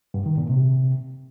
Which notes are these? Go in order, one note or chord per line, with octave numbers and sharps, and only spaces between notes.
G2
D#3
A#2
C3